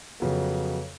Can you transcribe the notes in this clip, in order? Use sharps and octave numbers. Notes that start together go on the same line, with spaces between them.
F2 C#3 F#3 B3